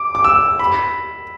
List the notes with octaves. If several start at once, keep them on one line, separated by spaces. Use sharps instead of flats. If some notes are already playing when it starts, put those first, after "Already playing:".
Already playing: D6
D6
E6
B5